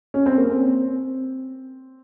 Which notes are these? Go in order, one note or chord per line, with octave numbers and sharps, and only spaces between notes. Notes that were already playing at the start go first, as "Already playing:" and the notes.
C#4
C4
A#3
C4